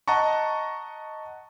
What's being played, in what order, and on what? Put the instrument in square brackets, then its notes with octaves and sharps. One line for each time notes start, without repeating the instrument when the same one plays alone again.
[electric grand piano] D#5 F#5 A5 A#5 C#6